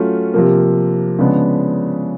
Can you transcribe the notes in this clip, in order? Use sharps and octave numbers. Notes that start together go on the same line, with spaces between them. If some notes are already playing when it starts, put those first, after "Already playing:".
Already playing: F#3 A3 C#4 F4
C3 F3 A#3
C#3 F3 G#3 B3 D4